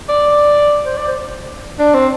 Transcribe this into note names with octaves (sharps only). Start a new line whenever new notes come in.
D5
C5
D5
C5
D4
C4